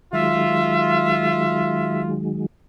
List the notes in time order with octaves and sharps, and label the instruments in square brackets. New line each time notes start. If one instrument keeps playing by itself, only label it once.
[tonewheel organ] D#3 F#3 G#3 [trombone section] F4 [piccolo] E5